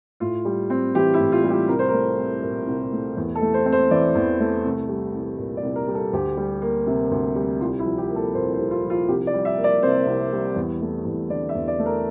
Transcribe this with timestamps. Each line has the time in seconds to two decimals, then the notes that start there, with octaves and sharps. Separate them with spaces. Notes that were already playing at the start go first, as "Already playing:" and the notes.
0.20 A2 F4
0.45 G3
0.70 C4
0.95 E3 G4
1.14 E4
1.20 A2
1.32 F4
1.44 G3
1.50 G4
1.69 C2 A#4
1.79 C5
1.89 A3 A#4
2.19 C4
2.42 A#2
2.67 C2
2.93 A3
3.17 E2
3.35 A4
3.41 A3
3.54 C5
3.65 C4
3.72 C5
3.91 E3 D5
4.15 E2
4.40 A3
4.65 C2
4.89 G3
5.15 C2
5.38 A#2
5.57 D5
5.63 C2
5.76 A#4
5.88 G3
5.95 A4
6.13 D2 G4
6.37 G3
6.62 A#3
6.87 C3
7.11 D2
7.35 G3
7.60 C2 F4
7.79 E4
7.85 F3
7.98 G4
8.10 A#3
8.16 A4
8.34 A#2 C5
8.53 C5
8.59 C2
8.71 F4
8.84 F3
8.90 F4
9.08 C2 G4
9.27 D5
9.33 G3
9.45 E5
9.58 A#3
9.64 D5
9.82 C3 C5
10.07 C2
10.32 G3
10.56 E2
10.81 A3
11.05 E2
11.30 D3 D5
11.49 E5
11.55 E2
11.68 D5
11.79 A3
11.86 A#4